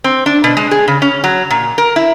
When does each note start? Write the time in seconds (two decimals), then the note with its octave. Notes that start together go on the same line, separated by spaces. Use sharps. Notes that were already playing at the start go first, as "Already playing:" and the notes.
0.04 C4
0.26 D4
0.44 B2
0.57 G#3
0.71 G#4
0.88 C#3
1.02 C#4
1.24 F#3
1.50 A#2
1.78 A#4
1.96 E4